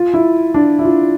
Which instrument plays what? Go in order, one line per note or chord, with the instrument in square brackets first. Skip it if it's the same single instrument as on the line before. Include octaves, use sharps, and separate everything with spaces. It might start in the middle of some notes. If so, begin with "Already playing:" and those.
Already playing: [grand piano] F4
E4
D4
E4
F4